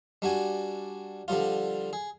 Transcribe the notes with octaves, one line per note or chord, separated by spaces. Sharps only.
G3 D4 F#4 G#5
D3 F3 G3 F4
G#4